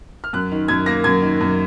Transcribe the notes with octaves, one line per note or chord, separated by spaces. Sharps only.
F6
F#2 F#6
D#3
F#2 G#6
A#3 A#6
F#2 G#6
D#3
F#2